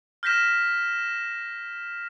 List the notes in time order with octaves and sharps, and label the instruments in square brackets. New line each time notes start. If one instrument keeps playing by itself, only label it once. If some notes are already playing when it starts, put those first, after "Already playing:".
[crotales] F6 G6 A#6 B6 E7